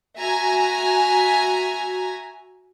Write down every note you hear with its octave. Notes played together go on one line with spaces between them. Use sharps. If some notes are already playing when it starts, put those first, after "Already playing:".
F#4 E5 G#5 A#5